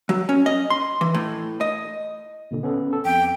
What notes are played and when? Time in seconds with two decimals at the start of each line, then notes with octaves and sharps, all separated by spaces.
0.09 F#3
0.29 C#4
0.46 D#5
0.70 C6
1.01 E3
1.14 A2
1.61 D#5
2.51 D#2 A#2 D3
2.63 B3 C#4 A4
2.93 A4
3.05 F2 G5